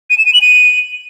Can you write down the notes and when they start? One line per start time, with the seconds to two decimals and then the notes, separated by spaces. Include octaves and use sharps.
0.10 D#7
0.18 E7
0.26 D#7
0.34 F#7
0.41 D#7